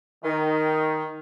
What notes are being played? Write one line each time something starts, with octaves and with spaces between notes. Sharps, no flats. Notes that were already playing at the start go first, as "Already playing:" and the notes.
D#3